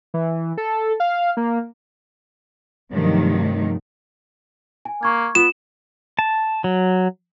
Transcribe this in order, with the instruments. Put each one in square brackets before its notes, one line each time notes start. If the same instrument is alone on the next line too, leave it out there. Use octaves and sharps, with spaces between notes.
[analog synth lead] E3
A4
F5
A#3
[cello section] G2 C3 D#3 F3 F#3 A3
[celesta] G#5
[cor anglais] A#3 [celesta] C#6 G#6
[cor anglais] B3 [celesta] F4 [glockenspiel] E7
[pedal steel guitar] A5
F#3